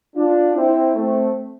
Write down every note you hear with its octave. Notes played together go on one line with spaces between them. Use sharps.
D4 F4
C4 E4
A3 C4